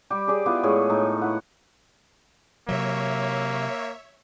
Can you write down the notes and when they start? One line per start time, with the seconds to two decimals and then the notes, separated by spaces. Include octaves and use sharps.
0.10 G3 G4
0.28 G4 G#4 D5
0.46 B3 E4 F4 D5
0.63 A2 G#3 G#4 C#5
0.90 A2 D#4
1.21 E4 F#5
2.69 C3 F#3 A#3 C#5 E5